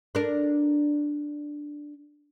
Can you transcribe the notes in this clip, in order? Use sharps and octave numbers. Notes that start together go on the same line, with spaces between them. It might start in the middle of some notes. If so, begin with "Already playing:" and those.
D4 A#4